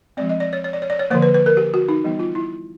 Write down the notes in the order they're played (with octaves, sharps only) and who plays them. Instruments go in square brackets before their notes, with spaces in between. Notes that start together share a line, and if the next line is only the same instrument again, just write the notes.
[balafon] F3 G#3 C4 D5
D#5
D5
C#5
C#5
D5
C#5
D5
C#5
D3 F3 A#3 C5
B4
B4
A#4
G4
F#4
D#4
E3 G3 B3 D#4
F4
E4